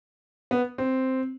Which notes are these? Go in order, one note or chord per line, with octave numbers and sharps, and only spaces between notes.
B3
C4